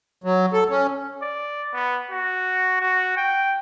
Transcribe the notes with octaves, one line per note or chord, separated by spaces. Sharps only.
F#3
A4
C#4
D5
B3
F#4
F#4
G5